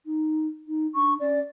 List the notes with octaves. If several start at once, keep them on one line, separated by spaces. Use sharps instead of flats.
D#4
D#4
D4 C#6
C#4 D5